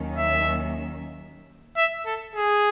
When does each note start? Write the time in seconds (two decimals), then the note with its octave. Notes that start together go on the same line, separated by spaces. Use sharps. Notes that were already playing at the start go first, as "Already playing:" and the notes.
Already playing: D#2 D#3 F#3 C#4
0.18 E5
1.77 E5
2.06 A4
2.35 G#4